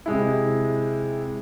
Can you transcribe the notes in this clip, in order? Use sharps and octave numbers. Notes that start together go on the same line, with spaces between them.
C3 G#3 E4